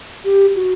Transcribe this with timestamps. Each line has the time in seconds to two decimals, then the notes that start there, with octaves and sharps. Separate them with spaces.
0.25 G4
0.56 F#4